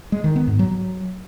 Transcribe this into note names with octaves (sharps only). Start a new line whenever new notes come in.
G#3
D#3
B3
G#2
F#3